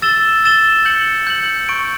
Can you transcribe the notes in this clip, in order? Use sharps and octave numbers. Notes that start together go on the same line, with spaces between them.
E6 A6 E7 G7
E6 A6 E7 G7
G6 C#7 F#7
G6 C#7 F#7
C#6 G6 D7